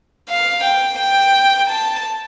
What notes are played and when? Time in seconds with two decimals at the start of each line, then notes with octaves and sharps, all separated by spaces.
0.28 F5
0.64 G5
0.98 G5
1.69 A5